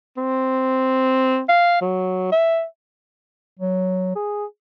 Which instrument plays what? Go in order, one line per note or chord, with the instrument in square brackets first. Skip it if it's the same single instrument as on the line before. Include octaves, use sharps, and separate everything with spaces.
[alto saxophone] C4
F5
F#3
E5
[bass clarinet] F#3
G#4